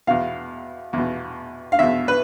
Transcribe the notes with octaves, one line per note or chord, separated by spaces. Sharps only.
E2 B2 F5
E2 B2
F5
E2 B2 E5
B4